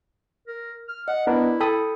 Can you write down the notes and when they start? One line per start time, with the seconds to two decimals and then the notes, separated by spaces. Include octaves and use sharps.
0.47 A#4
0.88 F6
1.08 D#5 F#5
1.27 B3 D4 E4 A#4
1.61 A4 G5 B5 D#6